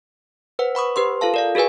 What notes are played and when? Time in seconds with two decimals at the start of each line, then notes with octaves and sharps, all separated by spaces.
0.59 B4 C5 F#5
0.75 F#5 B5 C#6 D#6
0.96 G4 B4 C5 C6
1.21 F4 A4 F5 A5
1.34 A#4 D5 F5
1.55 F#4 G#4 A#4 B4 G#5